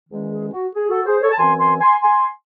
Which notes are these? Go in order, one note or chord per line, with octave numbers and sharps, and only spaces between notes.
E2 D#3 G#3 C#4
G#4
F#4
G#4
F#4 A4
G#4 C5
A4 C#5
A5
F#2 E3 C4 G#5 C6
G#5 C6
G#5 C6
G#5 C6